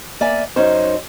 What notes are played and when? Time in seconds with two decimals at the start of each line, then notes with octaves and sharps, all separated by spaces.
0.20 A#3 D5 E5 G#5
0.56 F#2 C#4 D#4 C5